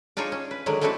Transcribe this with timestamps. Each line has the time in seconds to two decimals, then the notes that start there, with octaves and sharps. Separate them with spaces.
0.17 D4 D#4 F4 G#4 C#5
0.32 C#4
0.51 B4
0.66 D3 D#3 F#3 G#3
0.81 A3 C4 D4 E4 F#4 B4